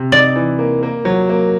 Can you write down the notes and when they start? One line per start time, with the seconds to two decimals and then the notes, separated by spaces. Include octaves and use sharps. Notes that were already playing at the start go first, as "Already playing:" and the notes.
Already playing: C3
0.12 D#4 D5
0.36 E3
0.59 A#3
0.83 A#3
1.05 F#3
1.29 A#3